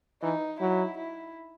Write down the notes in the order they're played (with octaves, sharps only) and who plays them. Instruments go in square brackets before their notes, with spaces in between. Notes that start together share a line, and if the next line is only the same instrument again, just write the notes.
[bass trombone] E3 [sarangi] D#4
[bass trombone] F#3 [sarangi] E4
[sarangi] E4